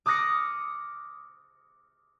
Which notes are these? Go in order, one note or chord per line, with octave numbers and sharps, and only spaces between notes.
D6 D#6 F6 F#6 A#6 C#7